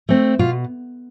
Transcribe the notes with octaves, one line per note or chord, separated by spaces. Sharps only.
A3 C4
B2 F4